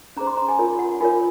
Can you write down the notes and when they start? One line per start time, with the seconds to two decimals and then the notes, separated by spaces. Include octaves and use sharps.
0.17 C#4 G#4 C5 A#5
0.27 C6
0.37 A#5
0.48 G#5
0.59 F4 A#4 C#5
0.79 F#5
1.01 F4 A#4 C#5 G#5